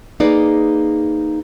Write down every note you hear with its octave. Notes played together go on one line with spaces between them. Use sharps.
A#3 D#4 G#4 B4 D5